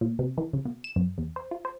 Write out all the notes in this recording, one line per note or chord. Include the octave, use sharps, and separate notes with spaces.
A#2
C3
E3
C#3
B2
E7
F#2
E2
C5
F4
C5